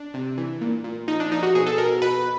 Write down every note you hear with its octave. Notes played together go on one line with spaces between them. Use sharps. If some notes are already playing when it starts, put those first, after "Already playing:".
Already playing: D4
C3
E3
A#2
A#2
F3 D#4
D4
F3 D#4
F#4
B2 G#4
A4
B2 A#4
B2 B4